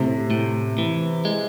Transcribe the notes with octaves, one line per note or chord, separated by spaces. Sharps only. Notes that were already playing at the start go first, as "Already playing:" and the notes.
Already playing: A2 C3
A2
E3
G#3